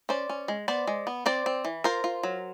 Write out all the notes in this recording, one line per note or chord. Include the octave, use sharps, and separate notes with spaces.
C#4 C5 D5
C#4
G#3
B3 C5 D5
G#3
B3
C4 C5 D5
C4
E3
F4 A#4 C5
F4
F#3